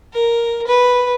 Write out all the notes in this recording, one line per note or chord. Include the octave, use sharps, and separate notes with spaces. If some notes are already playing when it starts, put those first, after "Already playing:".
A#4
B4